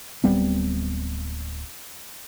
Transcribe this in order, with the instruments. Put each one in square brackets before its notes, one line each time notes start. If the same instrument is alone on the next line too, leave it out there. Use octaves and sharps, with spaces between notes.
[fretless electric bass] D1 G3 B3 C4